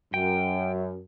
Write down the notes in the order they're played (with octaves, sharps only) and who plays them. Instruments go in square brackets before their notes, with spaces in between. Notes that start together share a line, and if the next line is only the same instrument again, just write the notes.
[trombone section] F#2 [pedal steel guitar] G5